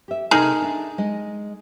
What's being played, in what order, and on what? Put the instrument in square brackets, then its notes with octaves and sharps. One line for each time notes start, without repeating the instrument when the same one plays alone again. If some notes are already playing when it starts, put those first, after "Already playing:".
[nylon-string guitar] G4 E5
[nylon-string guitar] C3 A3 [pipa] D#4 G#4 A#4
[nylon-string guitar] D4 E5
G#3 D#5